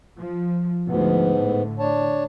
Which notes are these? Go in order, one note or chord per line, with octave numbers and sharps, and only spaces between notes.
F3
D2 G#2 F3 B3
A2 D3
D4 C#5 A5